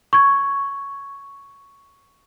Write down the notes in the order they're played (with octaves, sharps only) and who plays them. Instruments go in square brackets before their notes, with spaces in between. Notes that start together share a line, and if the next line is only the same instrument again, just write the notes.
[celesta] C#6 G#6